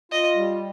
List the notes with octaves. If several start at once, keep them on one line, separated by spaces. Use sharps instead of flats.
F4 D#5
G3